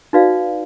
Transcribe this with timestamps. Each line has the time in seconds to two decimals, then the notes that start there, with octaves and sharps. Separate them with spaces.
0.13 D#4 F#4 B4 D5 F5